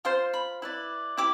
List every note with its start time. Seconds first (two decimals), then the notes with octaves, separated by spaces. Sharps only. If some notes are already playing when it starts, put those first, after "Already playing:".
0.05 F4 C5 C6
0.34 B5
0.62 E4 B4 D5
1.17 E4 G4 D6